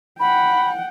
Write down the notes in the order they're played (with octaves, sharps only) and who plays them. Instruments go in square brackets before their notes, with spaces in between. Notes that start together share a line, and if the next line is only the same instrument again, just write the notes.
[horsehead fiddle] F#5 G5 [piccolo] B5